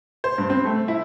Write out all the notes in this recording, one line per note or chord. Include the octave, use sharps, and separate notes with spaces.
C5
G2
C4
A3
E4